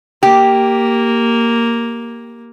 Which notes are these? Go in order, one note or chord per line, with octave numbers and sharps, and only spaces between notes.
A#3 G4